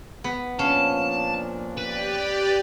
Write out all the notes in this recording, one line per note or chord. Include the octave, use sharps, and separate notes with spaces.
B3
A#2 F3 C#4 D4 F5 A5
G4 B4 D5